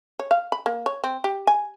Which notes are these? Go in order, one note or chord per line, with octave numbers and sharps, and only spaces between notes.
C#5
F5
B5
A#3
C#5
C4
G4
G#5